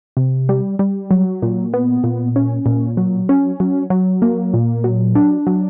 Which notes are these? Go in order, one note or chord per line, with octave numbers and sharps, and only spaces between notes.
C3
G3
G3
F#3
A#2
B3
A#2
C#4
A#2
F#3
C#4
F#3
F#3
A#3
A#2
F#3
D4
F#3